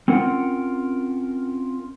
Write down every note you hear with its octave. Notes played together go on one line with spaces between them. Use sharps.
C4 C#4 F4 A#4 F#5